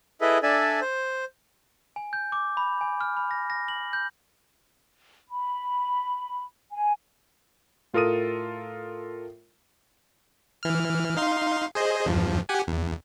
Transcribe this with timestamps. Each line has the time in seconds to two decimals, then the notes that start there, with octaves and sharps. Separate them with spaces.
0.21 E4 G#4 A4 B4 D#5 E5
0.43 D4 A4 D5 E5 G#5
0.81 C5
1.96 G#5
2.13 G6
2.32 D6
2.57 B5
2.81 G#5
3.01 F6
3.17 B5
3.31 A#6
3.50 A#6
3.68 F#7
3.93 G6
5.30 B5
6.73 G#5
7.94 A2 F4 A4 A#4 D#6 D#7
10.63 E3 F6
11.17 D#4 F5 C6
11.75 G#4 C5 D#5
12.06 E2 G2 F3
12.49 G4 F#5 G#5
12.67 E2